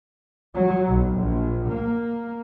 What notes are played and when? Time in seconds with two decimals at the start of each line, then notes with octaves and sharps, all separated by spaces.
0.55 F#3
0.87 B1
1.16 A#1
1.68 A#3